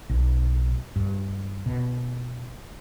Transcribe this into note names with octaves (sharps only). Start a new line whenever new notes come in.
B1
G2
B2